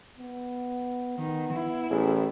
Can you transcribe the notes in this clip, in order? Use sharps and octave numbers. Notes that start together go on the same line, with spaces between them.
B3
D#3 B3
E4
A1 G#4